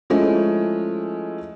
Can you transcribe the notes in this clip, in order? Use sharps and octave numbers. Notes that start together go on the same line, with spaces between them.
F3 G#3 A3 C#4 E4